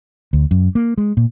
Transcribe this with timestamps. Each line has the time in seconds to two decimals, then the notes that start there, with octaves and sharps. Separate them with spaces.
0.33 D2
0.51 F#2
0.75 A#3
0.98 G#3
1.17 A#2